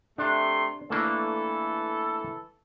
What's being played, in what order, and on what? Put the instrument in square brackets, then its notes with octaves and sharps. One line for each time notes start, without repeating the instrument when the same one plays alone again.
[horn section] C3 A3 C6 [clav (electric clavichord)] D4
[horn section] E3 A4 [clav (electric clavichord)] A3 A#3 D4